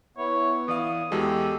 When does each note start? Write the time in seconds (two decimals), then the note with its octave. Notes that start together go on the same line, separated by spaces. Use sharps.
0.17 B3 E4 C#5
0.68 E3 D5 F5 D#6
1.12 E2 G#3 F#4 G4 A4